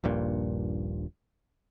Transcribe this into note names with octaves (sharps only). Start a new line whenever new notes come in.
D#1 A#1 G2 A#2